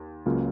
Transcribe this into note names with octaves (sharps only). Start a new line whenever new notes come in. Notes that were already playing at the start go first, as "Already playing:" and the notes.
Already playing: D#2
C#2 C#3 F#3 A#3 F4